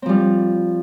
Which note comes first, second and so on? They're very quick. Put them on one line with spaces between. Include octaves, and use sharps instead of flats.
C4 F3 G3